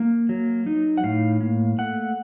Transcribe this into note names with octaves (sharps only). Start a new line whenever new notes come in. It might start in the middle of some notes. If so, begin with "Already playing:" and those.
Already playing: A#3
F#3
D#4
F#5
A2 F5
A#3
A3 F#5